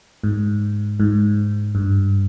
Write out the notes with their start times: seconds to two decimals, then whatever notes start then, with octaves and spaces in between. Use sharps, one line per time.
0.23 G#2
1.00 G#2
1.75 G2